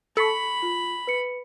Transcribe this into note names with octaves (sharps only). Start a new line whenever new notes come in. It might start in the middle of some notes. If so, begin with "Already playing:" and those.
A4 B5 C#6 B6 C#7
F4
B4 C#7